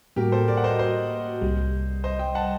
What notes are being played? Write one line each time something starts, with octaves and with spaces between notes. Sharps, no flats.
A2 G3 A#3 F#4 G4 A#4
A4 C5
A#4 D5
F#5
C5 D#5
C5 D#5
C2 C3 G3
C5 D#5
D#5 G5
F#5 A5